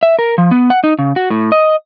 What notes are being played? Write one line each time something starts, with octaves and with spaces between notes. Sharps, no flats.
E5
A#4
F3
B3
F#5
D#4
C#3
F#4
A2
D#5